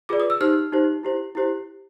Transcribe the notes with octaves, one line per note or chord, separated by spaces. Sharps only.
F4 G#4 B4 D5 D6
D#6
E6
D#4 G4 C5 F6
D#4 G4 C5
E4 G4 C5
E4 G4 C5